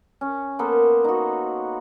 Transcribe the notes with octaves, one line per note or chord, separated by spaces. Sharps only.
C#4
A#3 B3 A4 C5
D#4 F#4